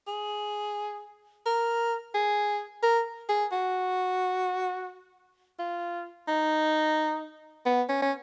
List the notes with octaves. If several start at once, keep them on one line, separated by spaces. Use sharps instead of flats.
G#4
A#4
G#4
A#4
G#4
F#4
F4
D#4
B3
C#4
C#4